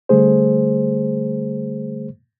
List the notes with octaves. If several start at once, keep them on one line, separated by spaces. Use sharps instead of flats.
D3 G3 A3 G#4 C5